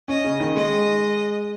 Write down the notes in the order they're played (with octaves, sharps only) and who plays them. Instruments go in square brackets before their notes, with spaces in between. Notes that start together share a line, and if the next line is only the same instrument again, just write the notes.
[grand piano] C#4 [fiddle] D#5
[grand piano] C#3
D#3
[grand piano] G#3 [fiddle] D#5